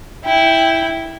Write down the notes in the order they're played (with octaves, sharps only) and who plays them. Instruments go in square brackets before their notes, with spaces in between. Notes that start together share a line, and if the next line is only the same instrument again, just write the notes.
[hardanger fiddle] E4 G5